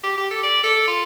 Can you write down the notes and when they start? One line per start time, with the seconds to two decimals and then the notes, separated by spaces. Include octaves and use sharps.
0.04 G4
0.18 G4
0.31 A4
0.43 D5
0.64 A4
0.88 F4